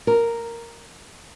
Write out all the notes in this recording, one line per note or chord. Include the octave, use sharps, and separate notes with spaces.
A#4